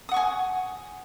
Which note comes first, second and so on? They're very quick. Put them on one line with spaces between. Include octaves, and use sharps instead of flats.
D#6 F#5 C#6 G#5